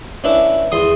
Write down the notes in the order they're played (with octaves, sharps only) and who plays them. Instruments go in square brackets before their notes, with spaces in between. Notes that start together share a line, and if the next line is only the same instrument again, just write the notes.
[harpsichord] C#4 D4 E4 B4
E2 C6 D#6